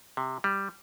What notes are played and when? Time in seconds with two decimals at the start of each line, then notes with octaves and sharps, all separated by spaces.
0.17 C3
0.44 G3